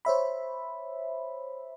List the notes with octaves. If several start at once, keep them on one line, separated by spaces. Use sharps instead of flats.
C5 C#5 E5 B5